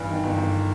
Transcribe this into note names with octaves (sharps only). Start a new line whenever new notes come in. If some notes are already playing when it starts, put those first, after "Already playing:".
Already playing: G2 E3
D#3
G1
G1